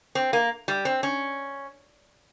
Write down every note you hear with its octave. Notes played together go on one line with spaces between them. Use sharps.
C4
A#3
G3
C4
C#4